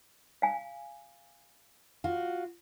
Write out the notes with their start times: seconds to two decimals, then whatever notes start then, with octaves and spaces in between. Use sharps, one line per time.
0.42 F5 G#5
2.04 F4 F#4